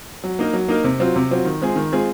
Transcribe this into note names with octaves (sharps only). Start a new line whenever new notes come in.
F#3
A#3 D#4 A#4
F#3
A#3 D#4 A#4
C3
F#3 C4 F4
C3
F#3 C4 F4
D#3
G#3 C4 F4 G#4
D#3
G#3 C4 F4 G#4